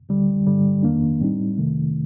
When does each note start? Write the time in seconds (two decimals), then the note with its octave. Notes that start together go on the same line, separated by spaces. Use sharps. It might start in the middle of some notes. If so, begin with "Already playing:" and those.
0.09 D2 D3 G3
0.46 G2 D3 G3
0.83 F2 D#3 A#3 D4
1.20 A2 G3 C4 D#4
1.57 F2 C3 D#3 A3